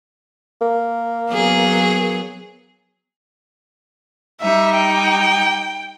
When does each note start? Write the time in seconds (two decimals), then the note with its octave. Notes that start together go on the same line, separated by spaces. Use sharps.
0.61 A#3
1.31 F#3 B3 G#4
4.41 G3 D#4 E5
4.76 G5